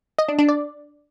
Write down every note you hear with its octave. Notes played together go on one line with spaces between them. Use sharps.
D#5
D4
D4
D5